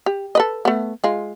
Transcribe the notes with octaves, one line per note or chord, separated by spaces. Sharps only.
G4
A4 B4 D#5
A3 B3
G#3 F4